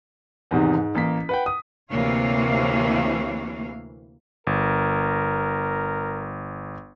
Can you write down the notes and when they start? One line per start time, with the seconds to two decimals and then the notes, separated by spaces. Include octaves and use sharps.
0.51 E2 G#2 C3 D#3
0.75 G#2
0.95 A1 A#3 B6
1.29 B4 F#5 G5
1.46 D#6
1.91 D2 C3 E3 A#3 C#5 F5
4.47 G1 A#4